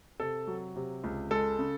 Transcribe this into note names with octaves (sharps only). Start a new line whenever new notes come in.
C3 A4
F#3
C3
C#2
G#3 A4
C#3